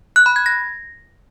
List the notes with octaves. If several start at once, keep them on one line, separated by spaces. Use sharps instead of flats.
F#6
B5
G#6
A#6